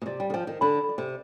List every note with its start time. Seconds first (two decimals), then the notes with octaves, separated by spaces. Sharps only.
0.02 B2
0.06 C3 D5
0.20 G3
0.30 D#3
0.34 F3 G5
0.47 D#3
0.61 D3 B5
0.89 D5
0.98 C3